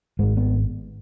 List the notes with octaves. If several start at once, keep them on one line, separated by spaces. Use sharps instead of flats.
G#1 G#2 G#3
B3